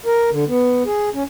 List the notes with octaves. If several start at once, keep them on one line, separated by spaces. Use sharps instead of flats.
A#4
D3
B3
G#4
C#4